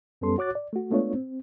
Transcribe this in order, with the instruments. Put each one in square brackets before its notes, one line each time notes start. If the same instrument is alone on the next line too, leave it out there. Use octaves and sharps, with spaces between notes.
[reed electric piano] F#2 G3 B3 C#4 A4 C6
F#4 C#5 D6 F#6 A6
D5
A3 F#4
G#3 A3 B3 D4 F4 C#5
C4